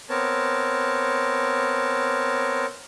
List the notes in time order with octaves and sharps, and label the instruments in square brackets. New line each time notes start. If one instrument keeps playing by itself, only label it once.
[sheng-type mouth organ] B3 C4 A#4 C#5 A5